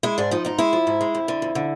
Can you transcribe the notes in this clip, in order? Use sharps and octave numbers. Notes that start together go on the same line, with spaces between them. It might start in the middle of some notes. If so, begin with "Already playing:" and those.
G#3 E4
G#2 D4
F3 D#4
G#2 D#4
G#3 E4
F3
G#2
G#3
F2
D3
F2
D3